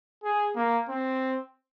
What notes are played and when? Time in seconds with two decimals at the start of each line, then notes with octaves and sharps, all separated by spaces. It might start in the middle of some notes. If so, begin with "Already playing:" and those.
0.24 G#4
0.56 A#3
0.89 C4